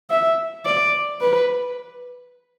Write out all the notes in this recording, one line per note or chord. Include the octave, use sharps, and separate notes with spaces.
E5
D5
B4